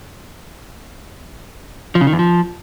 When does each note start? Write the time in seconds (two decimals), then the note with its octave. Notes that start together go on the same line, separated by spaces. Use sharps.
1.95 F3
2.01 C#3
2.07 D#3
2.13 E2
2.19 F3